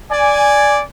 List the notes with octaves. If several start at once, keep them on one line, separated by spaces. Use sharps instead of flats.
D5 G#5